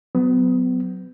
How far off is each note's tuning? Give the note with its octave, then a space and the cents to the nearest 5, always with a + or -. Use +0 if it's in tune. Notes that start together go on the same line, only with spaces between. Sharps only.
F#3 +0 B3 +30